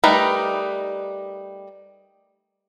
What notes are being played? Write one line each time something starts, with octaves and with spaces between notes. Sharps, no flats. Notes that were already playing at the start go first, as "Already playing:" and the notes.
G3 A3 D#4 A#4 B4